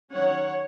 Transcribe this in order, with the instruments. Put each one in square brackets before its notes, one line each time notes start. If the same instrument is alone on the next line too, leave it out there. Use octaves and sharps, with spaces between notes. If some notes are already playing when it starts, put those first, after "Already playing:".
[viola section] D#3 F#3 C#4 C#5 F#5